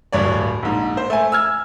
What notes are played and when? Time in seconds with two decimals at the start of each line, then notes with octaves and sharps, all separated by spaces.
0.12 D1 G2 C#5 D5
0.63 A#1 G#2
0.97 C5
1.10 A3 G#5
1.32 E6 F6 G#6